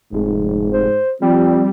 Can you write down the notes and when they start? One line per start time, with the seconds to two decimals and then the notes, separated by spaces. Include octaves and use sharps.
0.13 F1 G#2
0.73 C5
1.22 F3 G3 C4